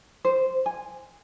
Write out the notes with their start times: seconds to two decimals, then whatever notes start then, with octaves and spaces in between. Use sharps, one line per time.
0.25 C5
0.66 G#5